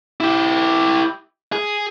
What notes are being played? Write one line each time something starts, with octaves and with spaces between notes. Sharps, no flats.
E4 G4
G#4